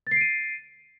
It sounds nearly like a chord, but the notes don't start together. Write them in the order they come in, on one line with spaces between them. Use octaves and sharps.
A6 C7 D7 D#7